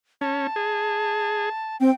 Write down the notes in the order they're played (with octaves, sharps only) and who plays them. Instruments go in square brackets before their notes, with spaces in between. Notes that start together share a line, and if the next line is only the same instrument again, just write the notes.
[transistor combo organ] C#4 [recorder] A5
[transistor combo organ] G#4
[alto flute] C4 [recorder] G5